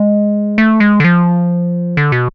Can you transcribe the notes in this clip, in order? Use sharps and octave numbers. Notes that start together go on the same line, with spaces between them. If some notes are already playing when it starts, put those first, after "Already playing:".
Already playing: G#3
A3
G#3
D3
F3
D3
B2